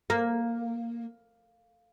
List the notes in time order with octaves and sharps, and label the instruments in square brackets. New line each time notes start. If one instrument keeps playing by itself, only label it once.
[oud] A#3